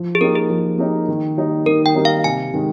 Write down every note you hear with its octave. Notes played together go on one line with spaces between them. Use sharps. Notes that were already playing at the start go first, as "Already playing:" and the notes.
Already playing: F3
G#4
A#3 D#4 G4 A#4
G#4
F3
A#3 D#4 G4
D#3
G3 A#3 D#4
D#3 A#4
G5
G3 A#3 D#4
F5
C3 G#5
D#3 G#3